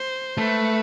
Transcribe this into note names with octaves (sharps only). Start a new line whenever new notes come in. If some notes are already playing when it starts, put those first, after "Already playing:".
Already playing: C5
A3 B4